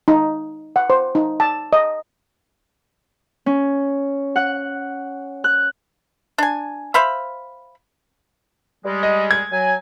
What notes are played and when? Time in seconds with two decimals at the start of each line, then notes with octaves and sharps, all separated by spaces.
0.08 D#4
0.76 F#5
0.90 C5
1.15 D#4
1.40 A5
1.73 D#5
3.46 C#4
4.36 F#5 F#6
5.44 F#6
6.38 D4 G#5
6.94 C5 E5 F5 B5
8.85 G3 G#3
9.03 D#5
9.31 G#6
9.52 F#3 G#5